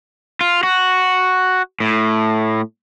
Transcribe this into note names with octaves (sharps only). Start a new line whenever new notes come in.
F4
F#4
A2